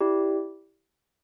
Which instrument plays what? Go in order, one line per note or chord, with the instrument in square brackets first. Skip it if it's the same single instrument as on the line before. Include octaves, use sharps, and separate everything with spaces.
[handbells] E4 G4 D5